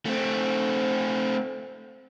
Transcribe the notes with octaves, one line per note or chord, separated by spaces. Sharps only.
A3 C4